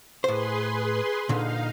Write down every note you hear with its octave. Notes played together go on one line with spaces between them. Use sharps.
A2 G#4 B4 C5 C6
A#2 D3 D#4 F5